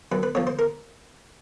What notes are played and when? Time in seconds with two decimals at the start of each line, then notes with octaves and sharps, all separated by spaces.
0.12 F#2 B4
0.23 B4
0.35 D3 F3 C#5
0.47 C5
0.59 A#4